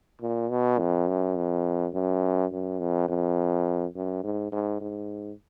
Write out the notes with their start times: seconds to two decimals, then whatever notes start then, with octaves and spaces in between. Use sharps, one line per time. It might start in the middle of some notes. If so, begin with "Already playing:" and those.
0.21 A#2
0.51 B2
0.79 F2
1.08 F#2
1.36 F2
1.94 F#2
2.52 F#2
2.79 F2
3.08 F2
3.96 F#2
4.23 G#2
4.52 G#2
4.80 G#2